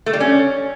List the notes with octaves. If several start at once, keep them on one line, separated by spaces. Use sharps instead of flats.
A3
G3
C#4